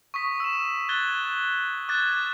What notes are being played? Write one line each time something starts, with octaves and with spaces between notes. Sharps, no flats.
C#6 D#6 B6
E6 E7
F#6 G#6 A6 G7
D6 F#6 G#6 A6